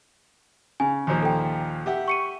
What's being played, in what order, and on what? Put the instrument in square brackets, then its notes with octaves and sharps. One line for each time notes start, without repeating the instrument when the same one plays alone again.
[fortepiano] C#3 [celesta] G#5
[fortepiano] D#2 A#2 F3
[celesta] A4 G5
[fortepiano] G4 E5 F#5
[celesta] C#6 C#7 D#7